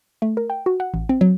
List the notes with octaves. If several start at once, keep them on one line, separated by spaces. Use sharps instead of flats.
A3
A#4
G5
F#4
F#5
A1
C4
F#3